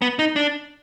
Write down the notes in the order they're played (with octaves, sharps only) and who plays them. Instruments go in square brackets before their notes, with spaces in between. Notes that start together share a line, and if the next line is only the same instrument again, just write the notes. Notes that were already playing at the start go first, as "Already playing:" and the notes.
[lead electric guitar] B3
D#4
D4